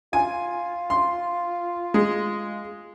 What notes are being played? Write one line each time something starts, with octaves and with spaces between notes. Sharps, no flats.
F4 G#5
C6
G#3